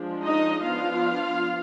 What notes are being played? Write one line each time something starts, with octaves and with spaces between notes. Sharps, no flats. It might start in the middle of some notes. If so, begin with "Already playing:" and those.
Already playing: F3 G#3 D4
D#4 D#5
F3 B3 D4 F4 F5